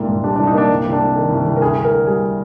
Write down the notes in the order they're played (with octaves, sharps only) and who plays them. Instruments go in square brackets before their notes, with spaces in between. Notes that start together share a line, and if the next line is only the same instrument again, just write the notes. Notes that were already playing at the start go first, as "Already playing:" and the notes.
Already playing: [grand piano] C2 G#2 A#3 D4
A#2
G3 D4
C2 D4
D#4
A#3 D4
C2
C2
D4
C3
D#3
C2
C2
A#4
D2 G#4
D2
A#4
D3
G3 G#4